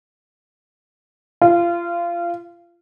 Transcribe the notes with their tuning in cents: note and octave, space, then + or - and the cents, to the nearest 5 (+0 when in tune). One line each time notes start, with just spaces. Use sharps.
F4 -25